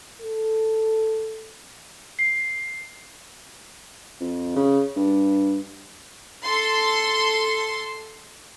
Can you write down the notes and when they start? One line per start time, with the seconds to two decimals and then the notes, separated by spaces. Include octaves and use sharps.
0.21 A4
2.19 C7
4.20 F2
4.56 C#3
4.96 G2
6.44 A4 C6